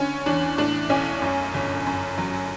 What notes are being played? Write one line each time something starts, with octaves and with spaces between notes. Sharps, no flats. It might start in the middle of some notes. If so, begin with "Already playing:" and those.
Already playing: D3 C#4
E2 D4
A2 D4
B1 C#4
F#2
G1
F#2
F#3